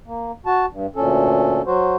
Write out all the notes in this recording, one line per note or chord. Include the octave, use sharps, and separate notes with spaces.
A#3
F#4 A5
G2
D2 A#2 C#4 A4
F#3 F#4 C5